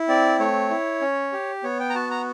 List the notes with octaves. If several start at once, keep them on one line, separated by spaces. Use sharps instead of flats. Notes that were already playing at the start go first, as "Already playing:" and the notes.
Already playing: E4
C4 D5
A3 C#5
E4
C#4
G4
B3 C#5
G5
A#5
F#4 A5
A#5